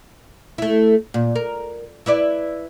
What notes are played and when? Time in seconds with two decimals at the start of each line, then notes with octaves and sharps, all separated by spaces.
0.58 A3 E4
1.14 A#2
1.36 A#4
2.06 E4 B4 D5